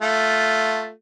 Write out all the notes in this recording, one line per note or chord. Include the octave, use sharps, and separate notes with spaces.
A3 F4